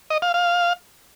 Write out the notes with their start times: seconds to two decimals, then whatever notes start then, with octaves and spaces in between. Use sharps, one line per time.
0.10 D#5
0.22 F5
0.34 F5